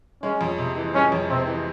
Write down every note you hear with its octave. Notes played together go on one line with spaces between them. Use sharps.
G#3 C#4
F2
C3
E3
G#3 C#4
F2
C3 C4
E3